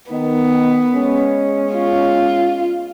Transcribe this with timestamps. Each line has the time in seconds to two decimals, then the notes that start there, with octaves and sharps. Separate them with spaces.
0.11 D#3 B3 D#4
0.94 G#3 C#4
1.74 F4